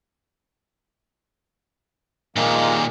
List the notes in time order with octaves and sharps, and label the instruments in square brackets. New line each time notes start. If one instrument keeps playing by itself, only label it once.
[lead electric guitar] A#2 D#3 [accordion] F3 G#3 A#3